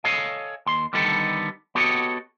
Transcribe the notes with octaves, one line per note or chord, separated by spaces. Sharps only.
A4 C#5 D#5 F5 G#5
D#2 C6
D3 D#3 G3 B3 D#4 A4
B3 F#4 G4 A4 C#5 D#5